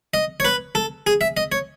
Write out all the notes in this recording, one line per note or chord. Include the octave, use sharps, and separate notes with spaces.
D#5
C#5
B4
A4
G#4
E5
D#5
C#5